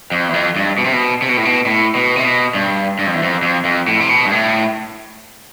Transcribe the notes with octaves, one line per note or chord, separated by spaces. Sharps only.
F2
E2
F2
G2
B2
C3
B2
C3
B2
A2
B2
A2
B2
C3
B2
G2
G2
F2
E2
F2
F2
F2
A2
C3
B2
G2
A2